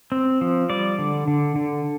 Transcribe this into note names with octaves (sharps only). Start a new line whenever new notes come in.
C4
F3
G3 D5
D3
D3
D3